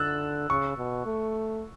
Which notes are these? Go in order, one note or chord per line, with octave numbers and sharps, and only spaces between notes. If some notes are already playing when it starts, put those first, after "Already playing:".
Already playing: D3 E6 F#6 A6
C#3 C#6
B2
A3